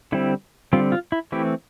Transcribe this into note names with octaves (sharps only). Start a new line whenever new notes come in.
D3 G3 C4 E4
D3 G3 C4 F4
F4
E4
E3 A3 C4 E4 G4